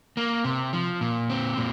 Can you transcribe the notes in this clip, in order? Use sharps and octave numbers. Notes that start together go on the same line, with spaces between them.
A#3
C3
F3
A#2
C4
A#2